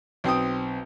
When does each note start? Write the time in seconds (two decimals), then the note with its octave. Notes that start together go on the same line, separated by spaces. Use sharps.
0.24 B1 C4 G5 D#6